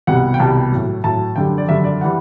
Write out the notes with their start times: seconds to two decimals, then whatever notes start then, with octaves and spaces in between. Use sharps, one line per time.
0.07 C2 B2 G3 F#5
0.34 G5
0.40 C2 B2 G3 A5
0.72 A2 F#3
1.04 A2 F#3 A5
1.36 F#2 D3 G3 G5
1.58 D5
1.68 F#2 D3 G3 E5
1.84 D5
2.01 E3 G3 F#5